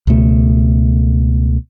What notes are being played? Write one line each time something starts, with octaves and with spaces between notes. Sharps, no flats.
C#2 B2 A3